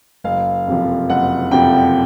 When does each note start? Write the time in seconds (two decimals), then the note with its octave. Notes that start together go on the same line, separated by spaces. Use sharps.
0.24 F#1 F5
0.67 F2 C3 F3
1.09 F#1 F#5
1.51 F2 C3 F3 G5